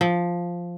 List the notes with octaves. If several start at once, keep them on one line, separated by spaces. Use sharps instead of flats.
F3